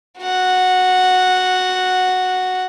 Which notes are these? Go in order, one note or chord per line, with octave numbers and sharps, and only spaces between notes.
F#4 F#5